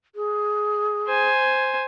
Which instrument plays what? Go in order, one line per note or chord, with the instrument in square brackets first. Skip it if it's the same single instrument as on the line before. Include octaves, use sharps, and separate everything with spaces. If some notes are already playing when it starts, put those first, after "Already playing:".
[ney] G#4
[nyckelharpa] C5 G#5